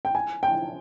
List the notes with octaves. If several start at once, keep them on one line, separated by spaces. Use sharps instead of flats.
G5
G#5
G5